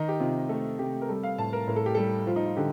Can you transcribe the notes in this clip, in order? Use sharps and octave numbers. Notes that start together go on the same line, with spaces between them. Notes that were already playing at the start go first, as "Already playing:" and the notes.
Already playing: D#3 D#4
G4
C3 F4
A3 A4
C3 G4
A#4
G3 A4
F5
A2 A5
A#4
A2 A#4
A4
G4
G3 A4
F3 F4
D#4
F4
D3 G4